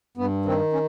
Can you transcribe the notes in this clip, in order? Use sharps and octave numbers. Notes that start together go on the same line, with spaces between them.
G2 B3
D#3 C4
C#4